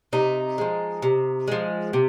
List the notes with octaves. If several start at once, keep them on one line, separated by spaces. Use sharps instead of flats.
C3 D#4
F3 G#3
C3
F3 G#3
C3